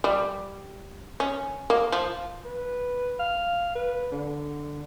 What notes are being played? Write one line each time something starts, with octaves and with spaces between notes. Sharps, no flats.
G3
C#4
A#3
F3
B4
F5
B4
D3